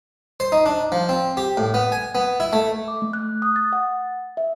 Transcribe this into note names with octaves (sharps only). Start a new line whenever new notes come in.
C5
D#4
D4
F3
C4
G4
A2
B3
G#5
B3
E4
A3
D6
A3
F#6
D#6
A6
F#5
E5